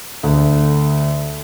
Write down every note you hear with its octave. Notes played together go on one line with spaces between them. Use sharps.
D2